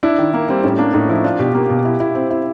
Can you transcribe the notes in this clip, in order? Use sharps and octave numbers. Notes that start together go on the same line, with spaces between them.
D4 E4
D#3
A#3
G3 C4
A2 C#4
A#3 D4
A2 D#4
F3 E4
D4 F4
B2 G4
A#3 G4
B2
E4
E4
C4
E4